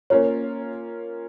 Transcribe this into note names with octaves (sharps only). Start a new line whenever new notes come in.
A#3 C#4 F4 A#4 C#5